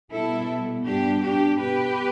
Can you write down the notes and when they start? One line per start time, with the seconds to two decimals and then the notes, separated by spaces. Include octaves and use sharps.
0.12 B2 G3 B3 E4 A4
0.85 G2 G3 B3 D4 G4
1.22 D4 G4
1.59 B2 B3 G4 B4